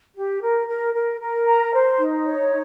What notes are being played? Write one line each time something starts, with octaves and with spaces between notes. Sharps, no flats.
G4
A#4
A#4
A#4
A#4
A#5
C5
D#4
C#5